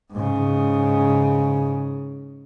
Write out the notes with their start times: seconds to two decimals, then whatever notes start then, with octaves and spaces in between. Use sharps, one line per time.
0.12 G#2 C#3